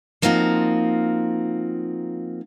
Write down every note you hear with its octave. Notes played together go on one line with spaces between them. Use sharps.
F3 A#3 C4 D#4 F4 F#4